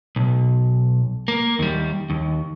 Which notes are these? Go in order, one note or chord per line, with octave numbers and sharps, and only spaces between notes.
B1
A#3
D#2 G3
D#2